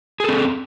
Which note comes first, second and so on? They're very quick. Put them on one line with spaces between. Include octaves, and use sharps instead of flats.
G#4 A4 C4